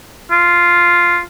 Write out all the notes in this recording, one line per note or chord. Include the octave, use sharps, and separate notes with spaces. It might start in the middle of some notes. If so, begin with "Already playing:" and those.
F4